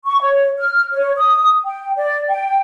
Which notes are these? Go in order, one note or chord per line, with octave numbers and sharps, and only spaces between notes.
C#6
C#5
F6
C#5
D#6
G5
D5
G5